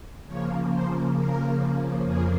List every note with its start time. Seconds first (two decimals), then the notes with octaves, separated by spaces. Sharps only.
0.25 C#3 F3 A#3 C#5
0.70 C5
1.15 A#4
2.04 F2 C#3 F3 A#3 G#4